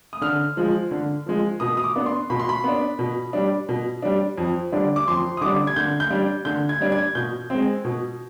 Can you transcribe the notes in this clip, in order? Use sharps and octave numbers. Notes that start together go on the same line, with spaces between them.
D#6
D3 F6
F3 G#3
D3
F3 G#3
B2 D#6
D#6
D6
B3 D4
C6
B2 B5
C6
B5
B3 D4
B2
G3 D4
B2
G3 D4
F2
D3 G3 D4
D6
F2 C6
D#6
D3 G3 D4 D6
G#6
D3 G6
G6
G3 D4
D3 G6
G#6
G3 D4
G#6
B2 G6
G#3 C4
B2